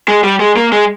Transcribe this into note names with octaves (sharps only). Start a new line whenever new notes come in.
G#3
G3
G#3
A#3
G#3